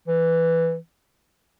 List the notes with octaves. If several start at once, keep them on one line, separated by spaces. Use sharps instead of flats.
E3